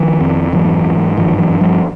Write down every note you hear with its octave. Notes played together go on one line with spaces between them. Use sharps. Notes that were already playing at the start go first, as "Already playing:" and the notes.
Already playing: D#3 F3
F2
G#2 E3 F#3
G#2
G2 D#3 F3
E3 F#3
G2
F3 G3